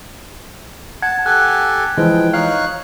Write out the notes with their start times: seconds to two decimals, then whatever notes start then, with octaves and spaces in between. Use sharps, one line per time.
1.02 F#5 A5 G#6
1.26 G4 A4 G#5 F#6
1.97 E3 F3 G#3 G5
2.34 D#4 C#5 F5 F#6